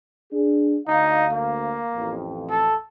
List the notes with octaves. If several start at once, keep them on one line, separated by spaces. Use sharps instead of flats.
D4 G#4
D2 D#4 F5
A#3
A1 F2
A4